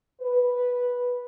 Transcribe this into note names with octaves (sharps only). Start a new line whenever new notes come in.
B4